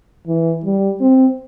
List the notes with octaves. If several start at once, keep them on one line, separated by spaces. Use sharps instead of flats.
E3
G3
C4